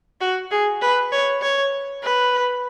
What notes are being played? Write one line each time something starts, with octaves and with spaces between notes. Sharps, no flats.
F#4
G#4
B4
C#5
C#5
B4